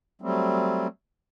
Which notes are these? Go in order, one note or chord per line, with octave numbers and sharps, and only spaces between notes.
F#3 G3 A3 C4